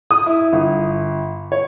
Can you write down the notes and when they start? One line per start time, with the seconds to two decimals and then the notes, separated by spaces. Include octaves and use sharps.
0.11 D#6
0.26 E4
0.53 G1
1.52 C#5